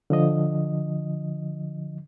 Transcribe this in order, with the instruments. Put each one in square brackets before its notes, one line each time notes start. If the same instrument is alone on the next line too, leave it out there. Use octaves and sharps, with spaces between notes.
[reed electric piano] D3 F3 D#5